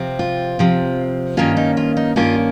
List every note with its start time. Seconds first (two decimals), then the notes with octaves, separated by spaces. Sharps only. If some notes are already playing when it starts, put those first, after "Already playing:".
Already playing: C3 F3 C4
0.19 F4
0.59 C3 F3 C4
1.37 G2 D#3 A#3 C#4 F4
1.57 D#4
1.77 F4
1.97 D#4
2.16 G2 D#3 A#3 C#4 F4